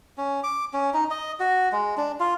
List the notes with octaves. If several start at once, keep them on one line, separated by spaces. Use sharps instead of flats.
C#4
D6
C#4
D#4
D#5
F#4
G#3
D4
F4